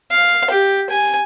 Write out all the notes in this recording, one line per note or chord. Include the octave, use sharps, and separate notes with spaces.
F5
G4
G#5